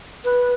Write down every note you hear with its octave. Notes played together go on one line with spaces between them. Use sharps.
B4